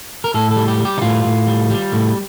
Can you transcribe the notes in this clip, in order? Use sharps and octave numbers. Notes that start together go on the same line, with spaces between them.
A#4
A2 A4
A4
G3
G4
G3
G4
D#4
A2 F4
A2
G3
G3
A2